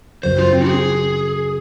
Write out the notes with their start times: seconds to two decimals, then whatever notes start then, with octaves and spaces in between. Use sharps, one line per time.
0.23 F#2 C#3 F#3 C5
0.38 F4
0.53 C4
0.67 G#4